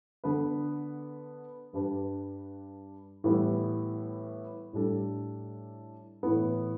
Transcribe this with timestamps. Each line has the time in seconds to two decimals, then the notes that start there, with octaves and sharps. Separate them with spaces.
0.24 D3 B3 D4 B4
1.73 G2 G3 D4 B4
3.24 A2 E3 G3 B3 E4
4.73 A2 G3 D4 A4
6.23 A2 E3 B3